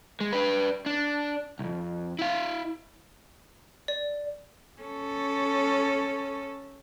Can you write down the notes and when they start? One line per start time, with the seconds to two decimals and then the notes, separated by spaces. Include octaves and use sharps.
0.21 G#3
0.33 D4 B4
0.86 D4
1.59 C2 F2
2.19 E4 F5
3.88 D5
4.82 C#4 A4